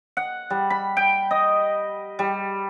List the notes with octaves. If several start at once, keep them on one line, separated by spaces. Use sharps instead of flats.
F#5
G3
B5
G5
D#5
G3